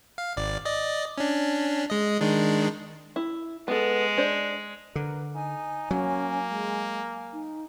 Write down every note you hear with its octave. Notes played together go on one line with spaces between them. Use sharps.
F5
G#1 D5
D5 D#5
C#4 D4
G#3 D#5
D#3 G#3 D4
E4
G#3 B3 A4
D4 C5
D3 A#4 B4
D#4 G#5
F#3 A#3 C#4
G#3
D#4